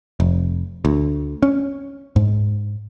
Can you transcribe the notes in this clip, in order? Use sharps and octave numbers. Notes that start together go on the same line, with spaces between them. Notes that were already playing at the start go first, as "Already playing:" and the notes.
F1
D2
C#4
G#2